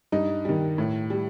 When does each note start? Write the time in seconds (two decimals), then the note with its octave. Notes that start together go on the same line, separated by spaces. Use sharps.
0.12 G2 D#4
0.45 D#3 G3
0.78 A2
1.10 G3